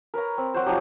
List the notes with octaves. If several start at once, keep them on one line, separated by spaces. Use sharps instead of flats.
A#4 B4 C#5 A#5
C4
F#3 F#4 C5
F3 F#3 D#4 G4